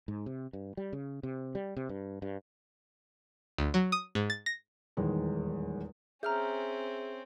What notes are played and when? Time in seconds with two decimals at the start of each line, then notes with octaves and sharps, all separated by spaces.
0.08 G#2
0.26 C3
0.53 G2
0.77 G3
0.93 C#3
1.23 C3
1.55 G3
1.77 C3
1.89 G2
2.22 G2
3.58 D2
3.74 F#3
3.92 D#6
4.15 G#2
4.30 A6
4.46 A#6
4.97 D#1 E2 D#3 G#3
6.23 C4 C#4 G#4 E5 A#5 F6 G6